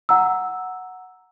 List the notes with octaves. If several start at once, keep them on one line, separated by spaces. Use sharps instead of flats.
F#5 A#5 E6